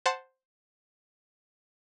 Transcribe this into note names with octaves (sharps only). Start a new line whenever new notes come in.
C5 F#5 A5 C6